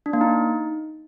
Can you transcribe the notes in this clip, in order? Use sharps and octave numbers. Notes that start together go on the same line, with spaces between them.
D4
A#3
D#4